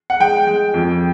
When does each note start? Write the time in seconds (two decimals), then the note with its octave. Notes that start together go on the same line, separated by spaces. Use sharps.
0.10 F#5
0.20 G#3 G5
0.47 G#3
0.74 F2